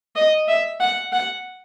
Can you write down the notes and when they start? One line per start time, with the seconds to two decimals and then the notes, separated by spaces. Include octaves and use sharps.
0.16 D#5
0.48 E5
0.81 F#5
1.13 F#5